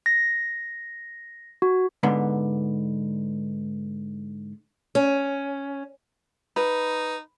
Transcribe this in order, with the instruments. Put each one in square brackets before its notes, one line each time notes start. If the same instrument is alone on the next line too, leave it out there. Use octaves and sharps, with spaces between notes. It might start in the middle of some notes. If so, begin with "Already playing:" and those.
[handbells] A#6
F#4
[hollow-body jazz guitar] G#2 D3 B3
[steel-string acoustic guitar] C#4
[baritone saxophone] D#4 [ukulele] B4